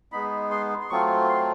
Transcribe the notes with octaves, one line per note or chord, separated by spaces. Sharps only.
G#3 B3 D#4 B5
C6
C6
F#3 A3 C4 F4 C#6
C6